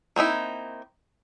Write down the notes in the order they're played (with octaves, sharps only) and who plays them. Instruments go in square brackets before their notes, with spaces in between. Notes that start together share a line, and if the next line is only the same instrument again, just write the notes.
[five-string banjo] A#3 C4 D#4 E4